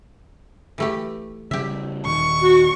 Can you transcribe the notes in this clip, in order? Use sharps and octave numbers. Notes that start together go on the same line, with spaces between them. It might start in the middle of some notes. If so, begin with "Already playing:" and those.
E3 A3 G4
C#3 G3 G4 E5
D#1 D#3 C#6
F#4